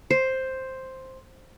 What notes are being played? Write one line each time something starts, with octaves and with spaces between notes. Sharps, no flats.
C5